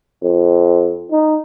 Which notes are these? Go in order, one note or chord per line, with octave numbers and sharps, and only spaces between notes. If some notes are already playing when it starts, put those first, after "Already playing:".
F2
D#4